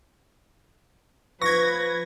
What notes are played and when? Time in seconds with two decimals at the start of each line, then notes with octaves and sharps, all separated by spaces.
1.41 F3 B4 C#6 G#6 A#6